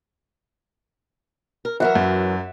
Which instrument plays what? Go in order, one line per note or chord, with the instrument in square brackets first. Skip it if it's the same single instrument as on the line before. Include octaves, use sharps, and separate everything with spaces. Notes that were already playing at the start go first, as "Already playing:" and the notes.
[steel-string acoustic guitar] A#4
[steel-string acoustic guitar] E3 F#3 A#4 [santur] E5 F#5
[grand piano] F#2